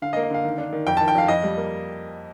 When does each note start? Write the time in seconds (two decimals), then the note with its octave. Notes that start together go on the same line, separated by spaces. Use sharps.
0.02 D3 F5
0.13 D#5
0.16 A#3
0.23 D#5
0.30 D3 F5
0.44 D#3
0.58 D4
0.73 D#3
0.87 F2 G5
0.97 D#3 A5
1.08 G5
1.15 F2 F5
1.28 F2 D#5
1.43 G3
1.57 A#3